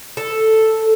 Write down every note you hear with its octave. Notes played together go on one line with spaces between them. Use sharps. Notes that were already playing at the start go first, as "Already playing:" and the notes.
A4